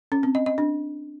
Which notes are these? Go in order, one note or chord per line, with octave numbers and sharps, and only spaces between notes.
C#4
C4
D#5
D#5
D4